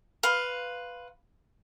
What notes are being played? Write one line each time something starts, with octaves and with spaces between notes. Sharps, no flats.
B4 F5 C6